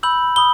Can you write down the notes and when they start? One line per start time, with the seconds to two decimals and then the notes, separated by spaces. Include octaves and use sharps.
0.03 B5 E6 G6 F#7
0.36 B5 D#6 G7